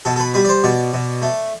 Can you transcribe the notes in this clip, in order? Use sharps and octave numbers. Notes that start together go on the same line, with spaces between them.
B2 A4
A4
B4
G3 B4
D5
C5
B2 D5
B2
A3